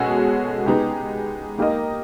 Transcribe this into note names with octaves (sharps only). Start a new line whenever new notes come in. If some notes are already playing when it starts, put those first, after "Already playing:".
Already playing: B2 G#3 C#4 F#4 A4
G#3 B3 D#4 G4
A#3 D#4 G4 A#4 D#5